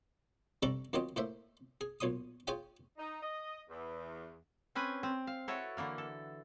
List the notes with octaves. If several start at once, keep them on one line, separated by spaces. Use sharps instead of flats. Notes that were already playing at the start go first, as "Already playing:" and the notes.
C3 G3 D4 A4 A#5 C#6
F#2 D#3 F3 F#3 C4 D#5
A2 A#3 C5 E5
G#4
B1 A#2 C#5 C6 D#6
F4 G#4 C#5 G5 G#5
D#4
D#5
E2
C4 C#4 B4 G#5
C4
F5
E4 F#4 A4 B4 C#5
D3 E3 A#3 A#4
A4